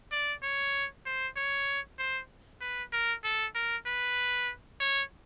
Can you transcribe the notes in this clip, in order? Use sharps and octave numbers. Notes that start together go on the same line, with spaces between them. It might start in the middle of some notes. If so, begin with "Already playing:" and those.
D5
C#5
C5
C#5
C5
B4
A#4
A4
A#4
B4
C#5